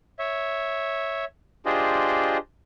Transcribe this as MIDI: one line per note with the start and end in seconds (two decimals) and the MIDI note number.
0.19 1.25 73
0.19 1.25 76
1.66 2.38 62
1.66 2.38 65
1.66 2.38 67
1.66 2.38 68
1.66 2.38 72
1.66 2.38 75